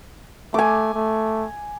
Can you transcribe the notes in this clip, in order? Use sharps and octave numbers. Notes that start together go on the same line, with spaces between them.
A3 G#5 D6
A3